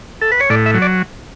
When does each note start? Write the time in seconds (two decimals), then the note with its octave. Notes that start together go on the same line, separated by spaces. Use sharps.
0.21 A4
0.32 B4
0.40 C#5
0.50 A2 D5
0.66 E5
0.74 F#3
0.82 D5